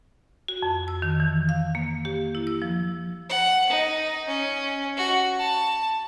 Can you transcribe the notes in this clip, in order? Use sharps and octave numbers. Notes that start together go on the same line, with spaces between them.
F#4
F2
E6
D#3
E3
F5
A#3
G4
E4
E6
F3
F#5
D#4
C#4
F#4
A5